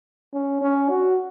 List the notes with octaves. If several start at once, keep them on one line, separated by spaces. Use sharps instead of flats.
C#4
C#4
F#4